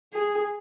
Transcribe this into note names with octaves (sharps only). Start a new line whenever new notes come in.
G#4